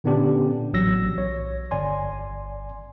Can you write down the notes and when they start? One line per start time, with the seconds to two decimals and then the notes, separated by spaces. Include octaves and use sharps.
0.04 A#2 D3 B3 C#4 D4 G4
0.73 A1 F#3 E6 A#6
1.17 B1 C#5
1.71 G1 D5 G#5 C6